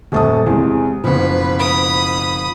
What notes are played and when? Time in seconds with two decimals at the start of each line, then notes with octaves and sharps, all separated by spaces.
0.12 D#1 F#2 A3 A5 D#6
0.46 E2 C3 G#3
1.04 F#1 B2 F3 B4
1.60 B5 D#6